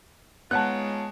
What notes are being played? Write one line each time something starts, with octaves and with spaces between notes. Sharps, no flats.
G#3 B3 D#4 F4 C#5 F#5 A5 F#6